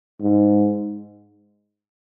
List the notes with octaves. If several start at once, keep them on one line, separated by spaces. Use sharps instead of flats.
G#2